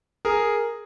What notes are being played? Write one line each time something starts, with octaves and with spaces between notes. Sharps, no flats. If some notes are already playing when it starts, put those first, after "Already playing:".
G#4 A#4